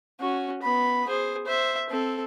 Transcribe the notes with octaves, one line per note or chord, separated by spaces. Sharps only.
C#4 F#4
B3 B5
G#4 C5
C5 E5
C4 A4